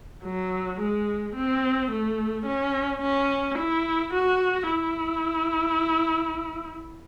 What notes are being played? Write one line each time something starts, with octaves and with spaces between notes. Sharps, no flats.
F#3
G#3
C4
A3
C#4
C#4
E4
F#4
E4